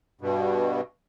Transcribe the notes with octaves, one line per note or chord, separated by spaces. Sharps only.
G2 B2